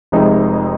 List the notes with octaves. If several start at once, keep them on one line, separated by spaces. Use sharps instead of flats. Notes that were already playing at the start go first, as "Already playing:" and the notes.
F1 F2 C3 G#3 D#4